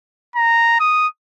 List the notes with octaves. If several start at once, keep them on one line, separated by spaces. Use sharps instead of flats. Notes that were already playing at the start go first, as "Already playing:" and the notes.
A#5
D#6